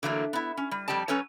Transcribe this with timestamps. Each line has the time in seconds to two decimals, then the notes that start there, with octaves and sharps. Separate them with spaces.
0.03 D3 E3 F#3 A3 A#3
0.33 B3 E4
0.57 C#4
0.71 G3
0.88 F2 G3 G4 D5 A5
1.08 F#3 C#4 A4 B4 C#5